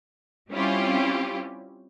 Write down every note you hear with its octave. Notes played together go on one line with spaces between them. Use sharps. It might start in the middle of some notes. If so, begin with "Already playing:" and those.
G3 C4 C#4 E4 F4 G4